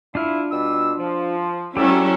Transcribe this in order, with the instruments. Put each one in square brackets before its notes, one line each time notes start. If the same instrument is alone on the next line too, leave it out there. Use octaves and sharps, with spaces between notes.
[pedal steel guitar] D4 F4 F6 [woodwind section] E4
[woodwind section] B2 G3 E6
F3
[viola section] F#3 C#4 E4 [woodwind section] C4 F#4 D5 [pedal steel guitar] G4 A4